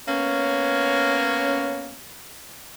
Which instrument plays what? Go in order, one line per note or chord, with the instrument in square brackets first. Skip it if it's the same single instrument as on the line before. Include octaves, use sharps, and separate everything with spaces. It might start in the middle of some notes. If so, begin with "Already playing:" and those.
[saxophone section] A#3 B3 C#4